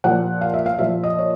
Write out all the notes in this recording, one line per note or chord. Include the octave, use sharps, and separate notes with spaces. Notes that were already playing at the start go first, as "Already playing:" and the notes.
A#2 F3 F#5
F5
E5
F5
A#2 F3 E5
D#5
C#5